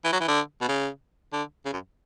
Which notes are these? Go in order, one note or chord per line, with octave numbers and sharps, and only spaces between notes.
E3
F#3
E3
D3
B2
C#3
D3
C#3
F#2